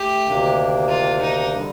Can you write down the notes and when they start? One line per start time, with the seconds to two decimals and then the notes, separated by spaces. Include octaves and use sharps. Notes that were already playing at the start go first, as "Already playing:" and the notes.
Already playing: A3 G4
0.25 D2 C3 D#3 A#3 D4
0.89 F4
1.22 D#4
1.53 D3 G3